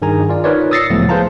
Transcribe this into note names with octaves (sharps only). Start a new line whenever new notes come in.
G2 D#3 G#4 G#5 A#5
F4 D5
D#4 F4 A#4 B4 C#5 D5
D#6 E6 A6 A#6 C7 C#7
C#2 A2 F3 F#3 A3 B3
G#4 B4 C5 F5 A5 A#5